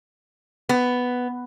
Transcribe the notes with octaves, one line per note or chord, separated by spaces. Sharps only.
B3